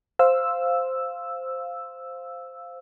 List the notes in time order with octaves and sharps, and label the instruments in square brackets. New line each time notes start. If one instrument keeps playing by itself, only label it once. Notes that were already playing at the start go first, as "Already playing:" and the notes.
[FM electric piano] C5 F5 E6